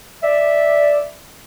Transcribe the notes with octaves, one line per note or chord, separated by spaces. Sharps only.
D5 E5